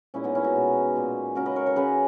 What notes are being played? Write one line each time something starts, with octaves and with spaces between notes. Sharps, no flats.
A#2 G#3 C#4 E4
B3 D#4
C#4 E4
D#4 F#4
B2 G#3
A#2 G#3
C#3 G#3 F#4 A#4
B4 D#5
A#4 C#5
A#4 C#5
C#3 G#3 G#4 B4